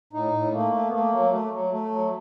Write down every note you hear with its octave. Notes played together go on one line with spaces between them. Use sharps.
A2 D#4
A2
A3 A#3
A3
B3
A3 A#3
F#3
A3
F#3
A3
F#3